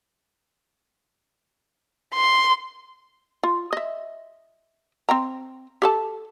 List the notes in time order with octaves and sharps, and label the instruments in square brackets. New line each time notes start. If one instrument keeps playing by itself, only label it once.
[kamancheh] C6
[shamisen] F4
D#5 E5
C4 G5 A#5
G4 A4 A5